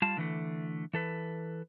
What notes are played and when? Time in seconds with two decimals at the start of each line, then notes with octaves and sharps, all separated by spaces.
0.02 G3 F4 F5 A5
0.17 D3 E3 A3
0.93 E3 A4 B4